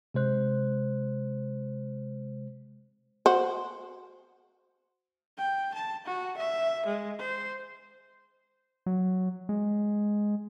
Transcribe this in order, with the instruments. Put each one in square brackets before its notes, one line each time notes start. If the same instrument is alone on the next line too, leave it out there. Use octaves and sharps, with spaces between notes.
[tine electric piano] C3 G#3 C5 F#6
[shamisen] F#4 C5
[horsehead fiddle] G5
A5
F#4
E5
G#3
C5
[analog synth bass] F#3
G#3